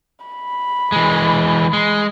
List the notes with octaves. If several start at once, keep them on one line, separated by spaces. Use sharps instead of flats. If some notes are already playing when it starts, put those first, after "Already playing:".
B5
E3 G#3
G#3